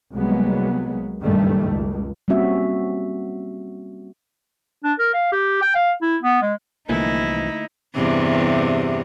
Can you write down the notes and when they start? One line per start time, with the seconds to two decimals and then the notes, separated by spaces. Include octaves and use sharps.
0.13 C2 F#3 G#3 A#3 B3
1.22 F#1 G2 A#2 D#3 G3 A3
1.67 C#2 B2
2.28 G3 A#3 C4 C#4 F#4 E5
4.84 D4
4.99 A#4
5.14 F5
5.32 G4
5.62 G5
5.75 F5
6.02 E4
6.23 B3
6.42 G#3
6.89 C2 D3 E3 F3 A3 A#3 D#4 E4
7.95 E2 G2 C3